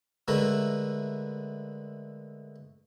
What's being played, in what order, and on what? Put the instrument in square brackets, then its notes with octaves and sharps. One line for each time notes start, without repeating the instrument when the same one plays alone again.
[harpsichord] D3 G#3 A3 E4 A#4 B4